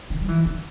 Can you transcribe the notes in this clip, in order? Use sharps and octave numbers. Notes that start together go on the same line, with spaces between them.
D3
G3
E3
D3